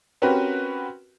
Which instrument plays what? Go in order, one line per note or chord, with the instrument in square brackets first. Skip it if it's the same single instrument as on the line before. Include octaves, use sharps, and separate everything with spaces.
[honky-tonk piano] C4 C#4 F#4 G4 A#4 B4